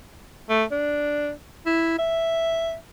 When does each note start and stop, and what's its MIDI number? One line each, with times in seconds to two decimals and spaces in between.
0.50 0.64 57
0.71 1.31 62
1.66 1.98 64
1.99 2.75 76